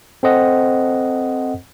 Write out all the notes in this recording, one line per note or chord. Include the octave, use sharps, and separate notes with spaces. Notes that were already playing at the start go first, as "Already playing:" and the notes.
C4 A4 C5 D#5 F#5